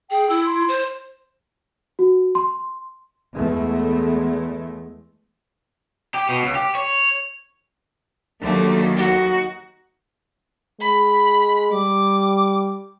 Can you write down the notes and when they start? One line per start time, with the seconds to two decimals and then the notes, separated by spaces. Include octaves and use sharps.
0.11 G#4 G5
0.30 E4 E6
0.45 C6
0.69 C5
1.99 F#4
2.35 C6
3.34 E2 G#3 A3
6.14 G4
6.29 B2
6.43 C#2
6.55 G4
6.75 C#5
8.41 D#2 D3 F#3 A3
8.97 D#4 F#4
10.80 G#3 B5
11.72 G3 D6